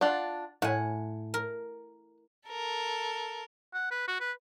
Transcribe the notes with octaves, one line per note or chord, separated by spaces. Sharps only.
D4 F4 F#5
A2 F#5 G#5
A#4
A4 A#4
F#5
B4
F#4
B4